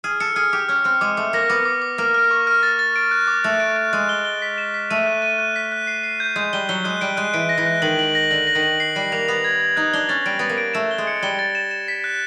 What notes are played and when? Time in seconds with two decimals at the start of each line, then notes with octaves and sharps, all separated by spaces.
0.04 G#4 F6
0.20 A4 C#7
0.36 G#4 F6
0.53 G4 D6
0.68 C#4 F6
0.84 C4 F6
1.01 G#3 D6
1.17 A3 D6
1.33 A#3 A#6
1.50 B3 D6
1.65 D6
1.82 D6
1.98 A#3 F6
2.14 F6
2.31 C#6
2.47 F6
2.63 A6
2.79 A6
2.96 D7
3.11 F#6
3.28 D6
3.44 A3 F#6
3.60 D7
3.76 F#6
3.93 G#3 F#6
4.09 G7
4.25 G7
4.42 B6
4.58 E7
4.74 B6
4.90 A3 D#7
5.07 F#6
5.22 D#7
5.38 F#6
5.56 B6
5.72 F#6
5.87 C7
6.03 C7
6.20 G6
6.36 G#3 G6
6.53 G3 G7
6.69 F#3 G7
6.84 G#3 F#6
7.01 G3 D7
7.17 G#3 F#6
7.34 E3 D7
7.49 A#6
7.58 E3
7.66 F#6
7.82 D#3 F#7
7.99 F#7
8.15 A#6
8.31 D3 F#7
8.47 A#6
8.55 D#3
8.63 F#7
8.80 C7
8.95 G3 C7
9.12 A#3 F7
9.28 B3 F7
9.44 G#6
9.60 G#6
9.76 D#4 F#6
9.93 D4 G7
10.09 C#4 A6
10.26 G3 D7
10.39 B3 A6
10.49 A#3
10.58 D7
10.74 A3 E7
10.91 G7
10.98 G#3
11.07 C#7
11.23 G3 G7
11.39 A6
11.55 E7
11.71 E7
11.88 B6
12.04 F#6